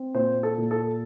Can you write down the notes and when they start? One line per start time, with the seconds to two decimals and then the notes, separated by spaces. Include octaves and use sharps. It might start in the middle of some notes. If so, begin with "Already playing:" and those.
Already playing: C4
0.14 A#2 C5
0.43 A4
0.57 A#2
0.71 A4